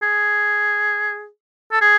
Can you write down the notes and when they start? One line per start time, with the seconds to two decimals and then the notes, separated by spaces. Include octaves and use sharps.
0.02 G#4
1.72 A4
1.81 G#4